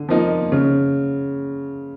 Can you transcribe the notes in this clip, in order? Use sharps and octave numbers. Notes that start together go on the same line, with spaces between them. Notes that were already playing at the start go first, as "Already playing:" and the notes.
Already playing: D3
F3 A#3 D#4
C#3